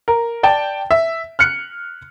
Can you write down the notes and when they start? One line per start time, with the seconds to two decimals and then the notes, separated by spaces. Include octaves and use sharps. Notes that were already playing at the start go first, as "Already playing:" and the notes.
0.08 A#4
0.43 D5 G5 A5
0.91 E5
1.39 F6 F#6 C#7